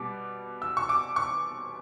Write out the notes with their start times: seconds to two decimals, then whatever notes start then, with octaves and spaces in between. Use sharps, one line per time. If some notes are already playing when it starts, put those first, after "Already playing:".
Already playing: B2 G3 B3 D6
0.62 E6
0.77 C#6
0.89 D6
1.16 C#6